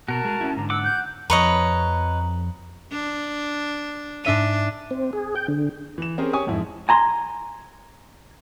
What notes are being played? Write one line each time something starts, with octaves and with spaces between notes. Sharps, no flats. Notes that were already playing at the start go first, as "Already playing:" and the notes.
B2 F#4 A#4 A5
G#3
C#4 E4
G#2 D3 A#5
F#5 D6 E6
G6
F2 F3 B4 C#5 D#5 A#5
D4
G#2 D4 E5 D#7
C4
G#4
G5
D3
E3 E7
C4 C#4 G4 G#4 A#4 C5
G4 C#5 G#5 C#6 D#6
F2 G#2 E4
G#5 A#5 C6